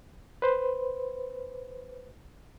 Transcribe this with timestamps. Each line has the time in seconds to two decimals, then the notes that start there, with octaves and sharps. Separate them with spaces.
0.42 B4 C5